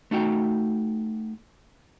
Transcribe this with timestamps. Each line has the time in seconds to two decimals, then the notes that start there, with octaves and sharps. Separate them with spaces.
0.11 A3 D#4 F#4 G5